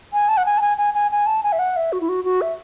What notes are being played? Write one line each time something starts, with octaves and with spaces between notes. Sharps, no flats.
G#5
A5
F#5
G#5
A5
G#5
G#5
G#5
G#5
A5
G#5
E5
F#5
E5
F#4
E4
F#4
F#4
E5